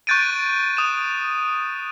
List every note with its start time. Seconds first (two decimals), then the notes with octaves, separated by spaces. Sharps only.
0.07 C#6 F#6 G6 A6 D7 D#7
0.77 D#6 E7